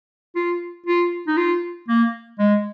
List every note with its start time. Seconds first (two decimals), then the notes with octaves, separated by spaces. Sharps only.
0.36 F4
0.87 F4
1.27 D#4
1.37 F4
1.88 A#3
2.39 G#3